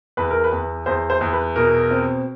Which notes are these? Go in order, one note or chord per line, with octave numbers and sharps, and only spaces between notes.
E2 B4
A#4
B4
E2
E2 C5
C5
E2
B4
B2 A#4
C4